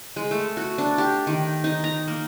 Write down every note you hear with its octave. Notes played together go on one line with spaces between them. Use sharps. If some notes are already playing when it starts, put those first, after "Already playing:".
G#3
A3
F#4
D4
G4
D#3
D#4
A#5
A#3